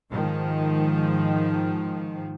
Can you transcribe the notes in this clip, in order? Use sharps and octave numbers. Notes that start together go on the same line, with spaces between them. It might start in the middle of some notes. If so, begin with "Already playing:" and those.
G#2 D#3 F3